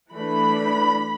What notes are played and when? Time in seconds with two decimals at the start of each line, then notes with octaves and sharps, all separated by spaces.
0.14 E3 A3 D4 B5